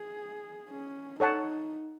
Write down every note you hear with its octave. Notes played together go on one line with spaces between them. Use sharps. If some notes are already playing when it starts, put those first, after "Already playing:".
Already playing: G#4
C#4
D#4 A4 C#5 F#5 A5